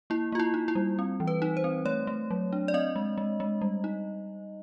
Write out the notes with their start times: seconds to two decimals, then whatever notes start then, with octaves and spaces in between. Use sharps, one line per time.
0.10 A#3 E4
0.32 A#3 F4
0.40 E4
0.54 D#4
0.68 E4
0.75 G3
0.99 C4
1.20 E3
1.27 B4
1.42 D#4
1.57 C5
1.64 C4
1.85 A3 C#5
2.07 A3
2.31 F#3
2.53 D4
2.68 D5
2.74 C4 D#5
2.96 G#3
3.18 G#3
3.40 G#3
3.61 G3
3.84 D#4